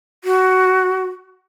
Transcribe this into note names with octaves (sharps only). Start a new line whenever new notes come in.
F#4